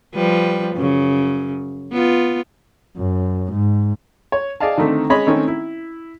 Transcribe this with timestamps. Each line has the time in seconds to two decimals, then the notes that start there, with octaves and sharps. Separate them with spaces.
0.14 F3 G3 B4
0.75 F#2 C#3
1.92 B3 F4
2.98 F#2
3.53 G#2
4.32 C#5
4.60 G#4 D5 D#5 F5 A5
4.78 D3 D#3 A3 C4
5.10 G#3 C#4 C#5 D#5 B5
5.27 D#3 A3 C4 C#4
5.48 E4